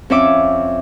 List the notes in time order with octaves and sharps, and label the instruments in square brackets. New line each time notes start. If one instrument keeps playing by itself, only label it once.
[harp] F2 C#4 C#5 E5 D6